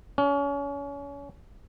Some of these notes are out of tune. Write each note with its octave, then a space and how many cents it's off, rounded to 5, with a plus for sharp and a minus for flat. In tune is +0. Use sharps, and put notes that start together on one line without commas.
C#4 +30